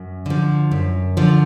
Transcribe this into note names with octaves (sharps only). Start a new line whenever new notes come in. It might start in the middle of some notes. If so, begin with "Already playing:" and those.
Already playing: F#2
D3 F3
F#2
D3 F3